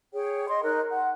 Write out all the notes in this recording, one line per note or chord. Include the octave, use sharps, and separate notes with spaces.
G#4 C#5 G5
D#5 C6 D#6
D#4 A#4 C#5 F#6
F#5